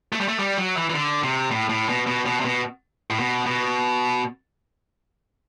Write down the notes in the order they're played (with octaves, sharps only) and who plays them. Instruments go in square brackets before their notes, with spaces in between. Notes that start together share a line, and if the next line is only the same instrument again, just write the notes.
[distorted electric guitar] A3
G3
A3
G3
F#3
E3
E3
D3
C3
A2
A2
B2
B2
B2
C3
B2
A2
B2
B2